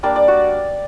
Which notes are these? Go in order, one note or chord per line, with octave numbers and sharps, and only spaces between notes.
G3 A#3 D4 D5
D5
F#4